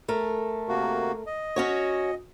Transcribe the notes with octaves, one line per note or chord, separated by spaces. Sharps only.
A3 A#4
C3 A#3 F#4
D#5
C#4 F#4 C#5